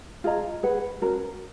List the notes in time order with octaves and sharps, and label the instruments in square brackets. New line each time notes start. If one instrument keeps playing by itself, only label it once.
[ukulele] F4 G#4 D#5 A#5
G#4 B4 F#5
C#4 F#4 A#4